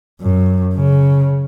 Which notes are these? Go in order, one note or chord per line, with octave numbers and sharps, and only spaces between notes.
F#2
C#3